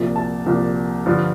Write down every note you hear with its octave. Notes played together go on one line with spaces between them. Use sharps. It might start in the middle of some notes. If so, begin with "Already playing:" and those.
Already playing: C2 A#2 F3
A5
C2 A#2 F3
G2 D3 F3